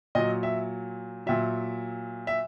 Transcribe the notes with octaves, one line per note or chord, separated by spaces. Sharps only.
A#2 F#3 D#5
E5
A#2 F#3 E5
E5